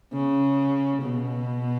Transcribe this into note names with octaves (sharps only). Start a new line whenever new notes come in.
C#3
B2